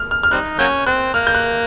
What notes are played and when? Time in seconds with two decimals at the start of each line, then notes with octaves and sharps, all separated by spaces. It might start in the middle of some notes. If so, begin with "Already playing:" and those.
Already playing: F6
0.11 F6
0.23 F6
0.31 G3 C4 D#4 F#6
0.59 F#3 A#3 C#4 G6
0.87 C4 F#6
1.14 A#3 F6
1.27 G6
1.35 F#6